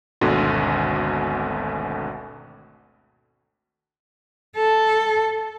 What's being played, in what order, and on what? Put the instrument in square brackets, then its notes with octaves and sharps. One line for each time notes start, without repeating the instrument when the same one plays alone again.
[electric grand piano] G#1 D2 B2 D3 F#4 C6
[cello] A4